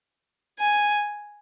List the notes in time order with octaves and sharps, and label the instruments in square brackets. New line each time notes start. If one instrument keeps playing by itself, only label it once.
[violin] G#5